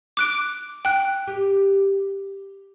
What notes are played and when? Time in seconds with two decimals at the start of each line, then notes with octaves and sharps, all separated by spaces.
0.17 D6 F#6 D7
0.85 G5 F#6
1.27 G4